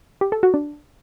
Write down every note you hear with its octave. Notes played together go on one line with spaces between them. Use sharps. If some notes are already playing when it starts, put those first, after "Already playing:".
G4
A4
F#4
D4